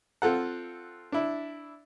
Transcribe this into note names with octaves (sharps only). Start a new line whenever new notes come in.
C4 F4 A4 F#5
D4 E4